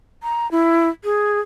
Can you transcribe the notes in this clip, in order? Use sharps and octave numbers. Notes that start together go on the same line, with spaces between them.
A#5
E4
G#4